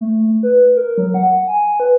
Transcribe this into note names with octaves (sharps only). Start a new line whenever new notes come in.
A3
B4
A#4
F#3
F#5
G#5
B4